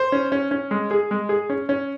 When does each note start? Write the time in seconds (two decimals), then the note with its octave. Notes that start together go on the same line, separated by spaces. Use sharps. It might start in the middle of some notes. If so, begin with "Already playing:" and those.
Already playing: C5
0.12 C#4
0.32 C#4
0.51 C#4
0.71 G#3
0.91 G#4
1.11 G#3
1.29 G#4
1.50 C#4
1.69 C#4